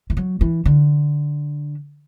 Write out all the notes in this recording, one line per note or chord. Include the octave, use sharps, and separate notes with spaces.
E3
F#3
E3
D3